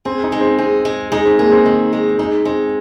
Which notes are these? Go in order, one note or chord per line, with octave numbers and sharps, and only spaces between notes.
C4 G#4
D#4
G#3
C4
C4 G#4
G#3
G#3 D#4
C4
A#3 G#4
C4
D#3 D#4
G#3
G#3 D#4
G#3 C4